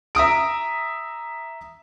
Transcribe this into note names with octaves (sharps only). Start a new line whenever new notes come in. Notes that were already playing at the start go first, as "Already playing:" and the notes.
E5 A#5 D#6 D7